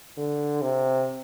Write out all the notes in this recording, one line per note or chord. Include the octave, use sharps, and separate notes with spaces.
D3
C3